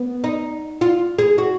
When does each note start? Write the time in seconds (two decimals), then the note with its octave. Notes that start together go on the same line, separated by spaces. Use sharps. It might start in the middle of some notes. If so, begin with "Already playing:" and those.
Already playing: B3
0.24 D#4
0.81 F4
1.18 G#4
1.38 F#4